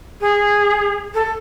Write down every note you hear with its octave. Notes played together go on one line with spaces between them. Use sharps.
G#4
A4